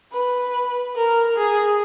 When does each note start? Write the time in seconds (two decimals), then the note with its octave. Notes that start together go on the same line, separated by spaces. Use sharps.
0.12 B4
0.96 A#4
1.36 G#4